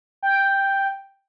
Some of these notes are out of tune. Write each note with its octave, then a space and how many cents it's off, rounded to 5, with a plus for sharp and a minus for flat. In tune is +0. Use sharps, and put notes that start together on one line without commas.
G5 +5